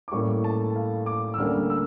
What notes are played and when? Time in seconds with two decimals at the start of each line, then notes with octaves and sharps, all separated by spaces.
0.08 D6
0.11 A2 G3 A#3 C#4 C#6
0.44 A5
0.76 F5
1.06 D6
1.34 E6
1.38 D2 D3 G3 A#3 C#4 F6
1.70 E6